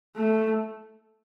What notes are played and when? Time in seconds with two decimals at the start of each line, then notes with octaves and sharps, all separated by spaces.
0.16 A3